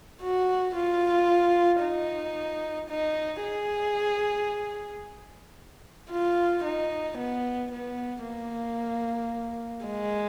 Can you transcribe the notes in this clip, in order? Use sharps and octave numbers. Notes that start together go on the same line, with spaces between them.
F#4
F4
D#4
D#4
G#4
F4
D#4
B3
B3
A#3
G#3